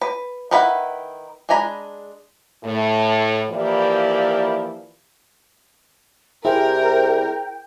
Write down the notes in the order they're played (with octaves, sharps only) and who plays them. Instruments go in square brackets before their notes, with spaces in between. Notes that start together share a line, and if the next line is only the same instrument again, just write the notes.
[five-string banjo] B4
D#3 E4 B4 F#5 B5
G#3 D4 G#5 A#5 B5
[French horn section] A2
E3 F3 A#3 E4 G4 D5
[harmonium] C3 G3 [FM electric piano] E4 G#4 C5 [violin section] A#4 [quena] G5